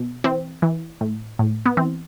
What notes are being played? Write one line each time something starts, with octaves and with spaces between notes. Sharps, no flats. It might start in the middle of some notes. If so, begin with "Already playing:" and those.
Already playing: B2
E3 C4
E3
A2
A2
B3
E3 C4